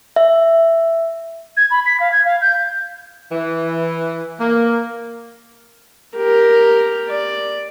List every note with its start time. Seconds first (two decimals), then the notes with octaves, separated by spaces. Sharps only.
0.16 E5
1.57 G#6
1.71 B5
1.86 B6
2.00 F5
2.12 G#6
2.25 F5
2.41 G6
3.32 E3
4.39 A#3
6.17 G4 A#4
7.09 D5